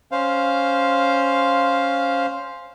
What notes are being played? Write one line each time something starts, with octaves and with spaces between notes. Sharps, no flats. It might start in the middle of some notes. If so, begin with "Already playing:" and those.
C#4 C5 F5